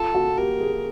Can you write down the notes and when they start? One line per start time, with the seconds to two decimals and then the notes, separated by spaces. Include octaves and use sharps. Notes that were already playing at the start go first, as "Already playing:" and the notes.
Already playing: F4 A4
0.14 F#4
0.37 G4 A#4
0.61 G#4